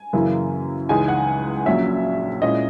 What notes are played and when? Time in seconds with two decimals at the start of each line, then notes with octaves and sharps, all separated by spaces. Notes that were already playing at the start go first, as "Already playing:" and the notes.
Already playing: G#5
0.13 F#2 C#3 E3 A#3 E4
0.89 C#2 C#3 E3 G#3 D#4 G#5
1.08 F#5
1.66 A#1 A#2 F#3 C#4 E5
2.42 A#2 G#3 C#4 E4 D#5